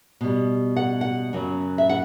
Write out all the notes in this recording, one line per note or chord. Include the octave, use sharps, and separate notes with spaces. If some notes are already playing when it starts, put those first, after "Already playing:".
B2 G3
F#5
F#5
F#2 C#3 F#3
E5
F#5